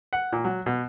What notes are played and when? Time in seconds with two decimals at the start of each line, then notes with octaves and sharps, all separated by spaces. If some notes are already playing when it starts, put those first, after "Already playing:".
0.13 F#5
0.33 A#2
0.45 F#3
0.66 B2